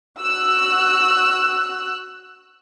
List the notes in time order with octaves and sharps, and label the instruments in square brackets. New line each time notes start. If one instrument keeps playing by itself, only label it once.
[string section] F#4 E6 F#6